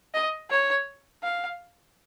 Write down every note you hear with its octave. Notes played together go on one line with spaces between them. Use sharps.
D#5
C#5
F5